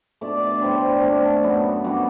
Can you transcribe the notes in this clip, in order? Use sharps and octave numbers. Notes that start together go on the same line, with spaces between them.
B2 A3 D4 D5
D5
A2 G3 D4 C5
C5
C5
D3 A3 C4 A4
F#2 F#3 B3
G2 F#3 B3 D4 F#4